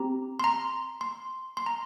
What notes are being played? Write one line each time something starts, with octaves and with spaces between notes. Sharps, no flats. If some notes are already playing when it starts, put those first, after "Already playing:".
Already playing: C4 G4 A#5
C6
A#5
C6
C6
A#5